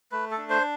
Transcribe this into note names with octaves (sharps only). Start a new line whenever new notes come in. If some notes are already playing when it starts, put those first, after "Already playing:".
A3 B4
A4
D4
C5